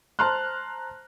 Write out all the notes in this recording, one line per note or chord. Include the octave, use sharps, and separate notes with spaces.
C5 A5 A#5 C6 F6 F#6